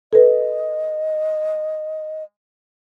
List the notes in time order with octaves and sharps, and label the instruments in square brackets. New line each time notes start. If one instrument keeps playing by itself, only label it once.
[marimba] A4 B4 [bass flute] D#5